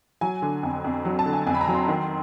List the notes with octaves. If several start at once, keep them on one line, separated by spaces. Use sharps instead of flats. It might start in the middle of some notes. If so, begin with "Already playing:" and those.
F#3 G#5
D3
F2
F2
F#3
A5
D3
G#5
F2 G#5
B5
A#5
F#3
C6
D#3